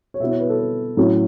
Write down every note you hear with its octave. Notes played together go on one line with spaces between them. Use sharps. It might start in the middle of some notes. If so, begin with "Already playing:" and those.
C#5
B2 B3 E4 E5
C#5
B4
A4
B4
A2 F#3 C#4 E4